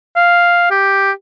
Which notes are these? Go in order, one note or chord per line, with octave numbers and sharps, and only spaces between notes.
F5
G4